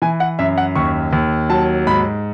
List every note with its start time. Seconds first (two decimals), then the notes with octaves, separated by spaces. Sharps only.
0.02 E3 G#5
0.20 F#5
0.39 F#2 E5
0.58 F#5
0.75 D#2 C#6
1.13 D#2
1.50 F#3 A5
1.87 G#2 B5